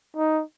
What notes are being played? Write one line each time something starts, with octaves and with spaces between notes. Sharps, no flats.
D#4